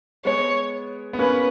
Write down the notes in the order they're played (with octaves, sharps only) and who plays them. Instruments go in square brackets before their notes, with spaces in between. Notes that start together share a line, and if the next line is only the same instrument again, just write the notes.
[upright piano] G#3 B3 [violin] C#5
[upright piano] B3
[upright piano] A#3 C#4 [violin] B4